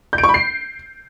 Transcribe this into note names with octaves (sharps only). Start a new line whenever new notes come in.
G6
D7
C#6
B5
C7